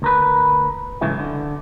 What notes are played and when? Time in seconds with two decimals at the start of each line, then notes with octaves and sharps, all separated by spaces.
0.02 D2 A#4 B4
1.01 G#2 C#3 E3 F#3 A3
1.19 D3